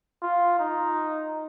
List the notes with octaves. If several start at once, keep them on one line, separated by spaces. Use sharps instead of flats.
F4
D#4